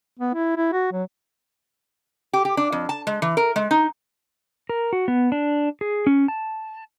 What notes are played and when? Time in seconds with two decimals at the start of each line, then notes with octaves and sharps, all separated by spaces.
0.19 B3
0.34 E4
0.57 E4
0.72 F#4
0.92 F#3
2.33 G4
2.45 G4
2.57 D4
2.72 F2
2.89 A5
3.07 G#3
3.22 E3
3.37 A#4
3.56 G#3
3.71 D#4
4.69 A#4
4.93 F#4
5.08 B3
5.32 D4
5.81 G#4
6.07 C#4
6.28 A5